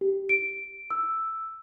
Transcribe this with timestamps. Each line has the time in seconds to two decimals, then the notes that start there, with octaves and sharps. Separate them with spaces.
0.01 G4
0.29 D7
0.90 E6